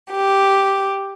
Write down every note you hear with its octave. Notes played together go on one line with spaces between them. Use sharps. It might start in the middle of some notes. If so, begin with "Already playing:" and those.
G4